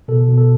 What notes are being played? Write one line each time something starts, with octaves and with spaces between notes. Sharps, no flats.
B2 A4
B2
A4